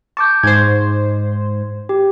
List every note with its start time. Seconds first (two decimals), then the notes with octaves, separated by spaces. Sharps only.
0.17 A5 C#6 D6 G6
0.43 G#2 C5 G#6
1.89 G4